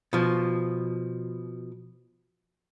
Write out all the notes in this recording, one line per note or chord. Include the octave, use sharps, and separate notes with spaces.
B2 F3